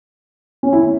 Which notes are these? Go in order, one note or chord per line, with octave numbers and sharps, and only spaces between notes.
C#4
E4